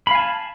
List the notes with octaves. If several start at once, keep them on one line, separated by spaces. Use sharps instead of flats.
F5 G#5 A5 B5